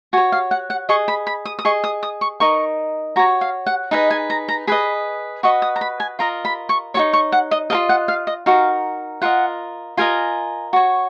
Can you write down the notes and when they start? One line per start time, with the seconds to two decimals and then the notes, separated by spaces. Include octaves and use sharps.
0.13 F#4 G#5
0.17 C#5
0.32 F5
0.51 F#5
0.70 F#5
0.89 G#4 D#5 C#6
1.08 B5
1.27 B5
1.45 D#6
1.59 D#6
1.65 G#4 D#5 C#6
1.84 D#6
2.03 D#6
2.21 C#6
2.40 D#4 A#4 D#5 C#6
3.16 F#4 C#5 A#5
3.41 F5
3.67 F#5
3.91 D#4 G#4 B4 D#5 F#5
4.11 G#5
4.30 A#5
4.49 A#5
4.67 G#4 B4 D#5 B5
5.43 F#4 B4 D#5 C#6
5.62 D#6
5.76 A#5
5.81 B5
6.00 G#5
6.19 F4 A#4 D#5 A#5
6.45 B5
6.69 C#6
6.94 D#4 F#4 C#5 C#6
7.13 C#6
7.32 F#5
7.51 D#5
7.70 F4 A#4 D#5 F5
7.89 F#5
8.08 F5
8.27 D#5
8.46 D#4 F#4 A#4 F5
9.22 F4 A#4 D#5 F#5
9.97 F4 A#4 D#5 G#5
10.73 F#4 C#5